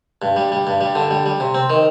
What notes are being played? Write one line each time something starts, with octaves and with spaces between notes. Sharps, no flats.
G2
G3
G3
G2
G3
D3
G3
G3
C3
C4
D#3